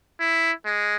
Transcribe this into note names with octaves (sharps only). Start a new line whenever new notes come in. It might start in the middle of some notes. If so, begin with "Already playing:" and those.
E4
G#3